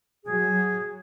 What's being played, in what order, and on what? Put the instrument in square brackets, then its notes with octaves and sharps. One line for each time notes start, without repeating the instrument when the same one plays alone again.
[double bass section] F#3 [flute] G#4